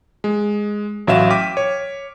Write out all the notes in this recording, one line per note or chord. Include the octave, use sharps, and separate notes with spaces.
G#3
A1 F#3 E5 F5 E7
G5 D6 F6 B6 D#7
C#5